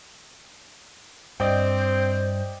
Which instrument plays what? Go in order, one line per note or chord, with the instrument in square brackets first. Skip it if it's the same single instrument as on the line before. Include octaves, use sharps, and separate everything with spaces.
[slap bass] G2 [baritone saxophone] C4 [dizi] C5 [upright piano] D5 D#5 G5